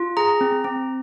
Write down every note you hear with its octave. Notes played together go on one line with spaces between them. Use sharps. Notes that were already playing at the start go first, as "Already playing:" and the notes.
Already playing: F4
G#4 A#5
C4
C4